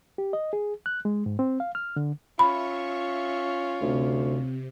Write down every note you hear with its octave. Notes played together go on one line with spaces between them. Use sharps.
G4
D#5
G#4
F#6
G#3
G#2
C4
F5
F6
D3
C#4 F4 E5 B5 C#6
D2 C3